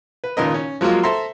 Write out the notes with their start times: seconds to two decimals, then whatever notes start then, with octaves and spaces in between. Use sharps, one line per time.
0.24 B4
0.37 G#1 A#2 C#3 A#4 B4 D#5
0.54 C#4
0.81 F3 F#3 G#3 A#3 F4
1.03 A4 C5 E5 A#5 C6